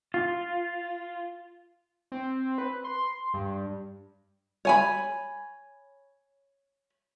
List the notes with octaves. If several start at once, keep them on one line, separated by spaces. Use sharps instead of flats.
F4
C4
B4
C6
G2
C#5 G#5 B5